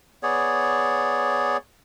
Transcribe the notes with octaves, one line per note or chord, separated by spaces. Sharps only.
B3 G#4 C#5 D5